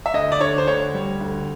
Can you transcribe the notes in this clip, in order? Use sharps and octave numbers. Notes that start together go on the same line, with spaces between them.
E5
D2 D#5
D5
D3 C#5
C5
D2 C#5
G3
D2